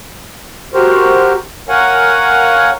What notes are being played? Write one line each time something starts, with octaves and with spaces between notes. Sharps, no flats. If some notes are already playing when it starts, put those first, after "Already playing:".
F#4 G4 A#4 C5
A#4 C#5 F5 F#5 G#5